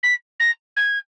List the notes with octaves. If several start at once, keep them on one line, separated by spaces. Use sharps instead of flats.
B6
A#6
G#6